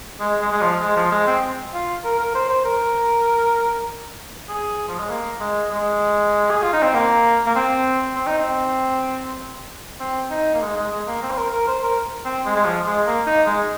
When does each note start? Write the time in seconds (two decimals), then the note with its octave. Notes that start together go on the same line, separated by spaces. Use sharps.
0.20 G#3
0.41 G#3
0.51 G#3
0.61 F3
0.81 G#3
0.96 F3
1.12 G#3
1.27 C4
1.73 F4
2.05 A#4
2.19 A#4
2.35 C5
2.49 C5
2.65 A#4
4.49 G#4
4.88 F3
4.99 G#3
5.10 A#3
5.40 G#3
5.71 G#3
6.51 G#4
6.63 F4
6.73 D#4
6.83 C4
6.94 A#3
7.46 A#3
7.55 C4
8.16 C4
8.27 D#4
8.38 C4
10.00 C4
10.31 D#4
10.54 A#3
10.62 G#3
10.77 G#3
10.91 G#3
11.07 A#3
11.23 C4
11.31 C5
11.37 A#4
11.54 A#4
11.68 C5
11.83 A#4
12.25 C4
12.45 G#3
12.56 G#3
12.65 F3
12.86 G#3
13.07 A#3
13.27 D#4
13.46 G#3